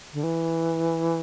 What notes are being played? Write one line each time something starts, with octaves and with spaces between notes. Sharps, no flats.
D3
E3